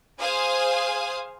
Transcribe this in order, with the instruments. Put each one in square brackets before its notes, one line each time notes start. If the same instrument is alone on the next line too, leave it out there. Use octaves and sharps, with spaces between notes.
[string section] G#4 C5 F5 G#5 D#6